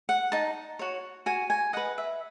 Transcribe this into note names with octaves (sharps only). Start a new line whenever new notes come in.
F#5
D#4 A5
F#4 C#5
F#4 G#5
G#5
B4 D#5 F#5
E5